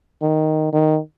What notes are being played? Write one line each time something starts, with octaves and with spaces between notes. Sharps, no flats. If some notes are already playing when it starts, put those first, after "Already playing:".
D#3
D#3